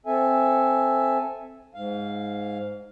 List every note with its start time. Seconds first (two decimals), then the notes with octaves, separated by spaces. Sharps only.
0.06 C4 A4 E5 G#5
1.75 G#2 F5